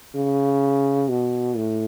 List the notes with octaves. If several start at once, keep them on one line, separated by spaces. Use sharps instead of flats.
C#3
B2
A2